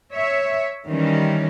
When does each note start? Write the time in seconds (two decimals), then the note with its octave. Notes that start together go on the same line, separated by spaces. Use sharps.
0.13 C#5 E5
0.88 D#3 E3 G3 C#4